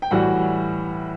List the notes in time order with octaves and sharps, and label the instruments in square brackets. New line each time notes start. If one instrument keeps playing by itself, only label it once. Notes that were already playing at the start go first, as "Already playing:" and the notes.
[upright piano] G5
A2 E3 G3 F#4 F#5